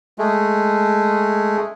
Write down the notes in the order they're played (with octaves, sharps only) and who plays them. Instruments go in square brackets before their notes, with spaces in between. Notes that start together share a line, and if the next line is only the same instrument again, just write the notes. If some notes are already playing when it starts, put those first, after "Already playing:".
[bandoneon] G#3 A3